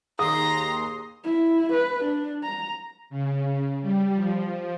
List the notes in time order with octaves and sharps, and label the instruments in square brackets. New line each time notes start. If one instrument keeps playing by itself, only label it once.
[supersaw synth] D#2 C6 [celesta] G#4 [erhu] A#5 [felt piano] D#6
[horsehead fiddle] E4
B4
D4
A#5
[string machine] C#3
G3
F3